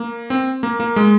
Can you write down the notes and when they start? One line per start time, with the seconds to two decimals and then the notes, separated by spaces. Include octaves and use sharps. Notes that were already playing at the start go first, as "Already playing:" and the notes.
Already playing: A#3
0.30 C4
0.63 A#3
0.80 A#3
0.96 G#3